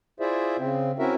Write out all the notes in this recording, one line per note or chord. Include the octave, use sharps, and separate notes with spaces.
E4 F4 G#4 C5 D5 E5
C#3 C4
C4 C#4 E4 F#4 A#4 E5